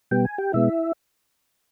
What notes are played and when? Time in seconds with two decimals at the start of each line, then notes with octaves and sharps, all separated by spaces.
0.11 B2 G3 B3 G5
0.25 G#5
0.38 G4 G5
0.53 B2 G#3 B3 E4 E5